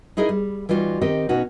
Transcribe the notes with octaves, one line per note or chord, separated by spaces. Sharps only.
D#4 E4 G#4 A#4 D#5
G3
E3 G3 D#4 F4 F#4
D#3 C4 G4 D#5
B2 C#4 D#4 F#4